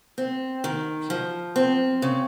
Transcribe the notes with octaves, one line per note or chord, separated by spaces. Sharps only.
C4
D#3
F3
C4
C#3